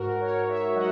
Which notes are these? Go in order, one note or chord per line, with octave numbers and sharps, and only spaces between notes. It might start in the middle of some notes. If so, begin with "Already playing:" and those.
Already playing: G#2 F#4 A#4
A#4 C#5
G#2
C#5 E5
F#3 D#5 F#5